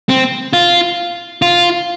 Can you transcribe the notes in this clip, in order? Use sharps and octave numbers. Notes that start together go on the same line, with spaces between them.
C4
F4
F4